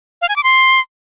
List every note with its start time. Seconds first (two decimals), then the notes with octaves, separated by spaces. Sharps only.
0.22 F5
0.29 G#5
0.36 D6
0.44 C6